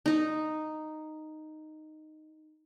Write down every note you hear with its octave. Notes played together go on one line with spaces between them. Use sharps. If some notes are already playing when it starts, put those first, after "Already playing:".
D#4 D#5